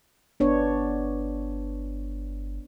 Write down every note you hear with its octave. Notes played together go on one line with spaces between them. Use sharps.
G1 B3 D4 C#5